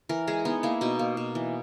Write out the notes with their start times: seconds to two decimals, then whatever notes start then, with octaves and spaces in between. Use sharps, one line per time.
0.09 E3 A#4
0.27 G#3 G#4
0.45 B3 D#4
0.63 A#3 E4
0.81 B2 D#4
0.99 A#3
1.17 B2
1.35 E3